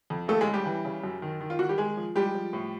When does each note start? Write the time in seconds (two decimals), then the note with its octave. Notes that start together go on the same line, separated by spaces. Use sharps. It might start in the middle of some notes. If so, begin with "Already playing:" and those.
0.10 F2
0.28 D#2 A3 A4
0.41 G#3 G#4
0.47 C#3
0.54 G3 G4
0.66 E3
0.85 C#3
1.04 F#2
1.22 D#3
1.41 D#3
1.50 F4
1.59 D#3 F#4
1.69 G3 G4
1.78 G#3 G#4
1.97 F3
2.15 G3 G#3 G4
2.34 F3
2.53 A2